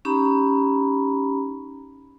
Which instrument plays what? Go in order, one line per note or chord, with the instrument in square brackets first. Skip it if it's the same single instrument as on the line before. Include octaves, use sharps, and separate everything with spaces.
[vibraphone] C#4 D#4 G4 A#5 B5